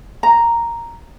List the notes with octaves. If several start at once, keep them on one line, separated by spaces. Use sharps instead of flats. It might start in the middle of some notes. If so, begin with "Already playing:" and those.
A#5